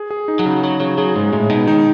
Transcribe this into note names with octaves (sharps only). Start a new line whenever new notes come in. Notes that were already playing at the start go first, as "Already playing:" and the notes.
Already playing: G#4
G#4
D#4
F#3
C#3
F#3 G#4
C#3 F#3
F#3 G#4
G#2 G#3
A2 G#3
B2 D#4
D#3 D#4